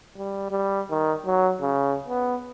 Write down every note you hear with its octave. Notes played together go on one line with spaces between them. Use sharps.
G3
G3
D#3
F#3
C#3
B3